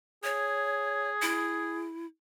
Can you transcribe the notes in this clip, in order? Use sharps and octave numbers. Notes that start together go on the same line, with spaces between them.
G#4 C#5
E4